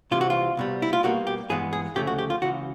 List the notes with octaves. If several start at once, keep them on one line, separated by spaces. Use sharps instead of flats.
C2 C3 E3 F4
F#4
F4
C2 B2 G3
E4
F4
B2 G3 A#3 F#4
G4
G2 E3 G#3 B3 G#4
G#4
D2 C#3 F3 A3 G4
F#4
G4
F4
C#2 C#3 E3 F#4